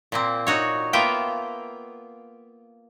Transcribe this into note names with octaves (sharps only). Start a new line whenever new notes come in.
A#2 A#3 C4
D#4 F#4 C#5
A#3 B3 F4 E5 G5